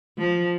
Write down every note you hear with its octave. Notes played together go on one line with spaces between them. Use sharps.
F3